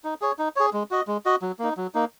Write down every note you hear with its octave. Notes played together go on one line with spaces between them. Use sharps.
D#4
G#4 C#5
D#4
G#4 C#5
G#3
F#4 D#5
G#3
F#4 D#5
F#3
A#3 D#4
F#3
A#3 D#4